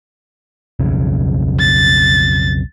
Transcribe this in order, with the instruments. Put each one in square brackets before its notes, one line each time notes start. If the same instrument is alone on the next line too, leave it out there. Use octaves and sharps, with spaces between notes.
[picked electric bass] B1 F2 C#3
[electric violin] A6